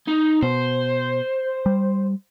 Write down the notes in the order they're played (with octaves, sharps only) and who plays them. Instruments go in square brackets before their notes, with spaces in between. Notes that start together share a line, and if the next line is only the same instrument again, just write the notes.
[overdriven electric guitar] D#4
[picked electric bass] B2 [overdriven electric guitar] C5
[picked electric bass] G3